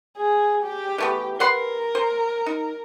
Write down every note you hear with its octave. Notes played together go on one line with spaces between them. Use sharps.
G#4
G4
E3 A3 B3
A#4 B4 F#5 C6
C5
D#4